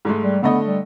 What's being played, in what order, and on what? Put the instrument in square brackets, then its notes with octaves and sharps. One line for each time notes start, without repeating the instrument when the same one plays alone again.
[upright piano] G#2 G#3 A3
[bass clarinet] G3
[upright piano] D3 A3 D#5 [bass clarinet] B3
[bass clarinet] G3